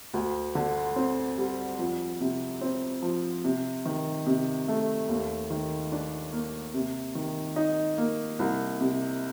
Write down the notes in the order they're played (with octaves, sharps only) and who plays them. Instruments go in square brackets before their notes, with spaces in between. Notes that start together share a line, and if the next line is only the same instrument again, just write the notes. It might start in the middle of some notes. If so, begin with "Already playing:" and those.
[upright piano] D2
D3
C4
G3
F2
C3
C4
F3
C3
D#3
C3
A3
D#2
D#3
D4
A#3
C3
D#3
D#4
A#3
C2
C3